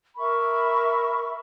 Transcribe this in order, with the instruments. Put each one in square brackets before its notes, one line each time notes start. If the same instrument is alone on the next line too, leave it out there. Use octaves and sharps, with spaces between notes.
[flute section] A#4 E5 B5 C#6